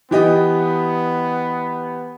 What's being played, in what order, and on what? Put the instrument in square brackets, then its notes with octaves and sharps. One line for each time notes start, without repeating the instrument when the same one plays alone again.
[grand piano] E3 G4 D#5 [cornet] B3